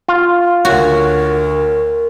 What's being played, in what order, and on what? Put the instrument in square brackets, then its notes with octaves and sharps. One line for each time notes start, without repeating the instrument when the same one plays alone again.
[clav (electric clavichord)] F4
[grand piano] D2 C#5 [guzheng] F#4 [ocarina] A#4